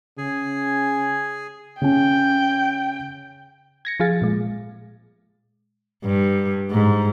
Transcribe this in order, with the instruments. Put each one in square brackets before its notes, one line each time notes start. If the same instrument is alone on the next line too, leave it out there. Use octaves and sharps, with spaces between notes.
[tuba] C#3 [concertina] G#4 G#5
[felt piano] C#3 C#4 [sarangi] G5
[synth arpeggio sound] G#6 A#6 C#7
F3 F4 G#4 F5 A6
A#2 G#3
[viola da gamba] G2
G#2